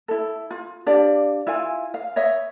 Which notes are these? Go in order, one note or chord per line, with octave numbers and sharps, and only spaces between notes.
E4 A4
F4
D4 G4 D5 F5
E4 F4 F5 G#5
F5
C#5 D#5 E5